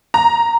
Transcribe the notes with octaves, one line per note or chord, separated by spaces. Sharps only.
A#5